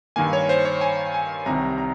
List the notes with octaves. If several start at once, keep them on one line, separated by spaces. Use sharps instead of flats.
G2 D#3 A#3 G#5
C#5
C5
C#5
G#5
G#5
C2 C3 D#3 G3 A#5
A#5